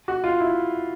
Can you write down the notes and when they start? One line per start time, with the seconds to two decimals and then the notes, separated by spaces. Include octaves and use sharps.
0.08 F#4
0.24 F4
0.40 E4